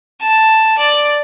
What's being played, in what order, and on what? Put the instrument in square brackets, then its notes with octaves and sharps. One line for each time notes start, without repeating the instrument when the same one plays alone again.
[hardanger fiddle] A5
D5